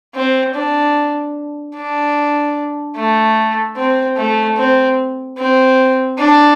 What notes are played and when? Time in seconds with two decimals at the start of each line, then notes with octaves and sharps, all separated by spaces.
0.15 C4
0.54 D4
1.75 D4
2.96 A3
3.76 C4
4.17 A3
4.57 C4
5.38 C4
6.18 D4